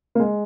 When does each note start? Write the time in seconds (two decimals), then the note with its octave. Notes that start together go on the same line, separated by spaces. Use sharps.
0.15 A#3
0.20 G#3